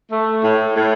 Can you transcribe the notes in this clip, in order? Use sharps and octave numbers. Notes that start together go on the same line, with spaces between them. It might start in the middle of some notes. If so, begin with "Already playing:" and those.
A3
A2
A2